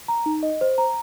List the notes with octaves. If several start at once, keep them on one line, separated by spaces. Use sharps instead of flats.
A#5
D#4
D#5
C5
A#5